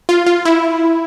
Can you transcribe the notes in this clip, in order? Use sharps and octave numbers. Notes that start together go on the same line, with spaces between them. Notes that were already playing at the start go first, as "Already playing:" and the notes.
F4
F4
E4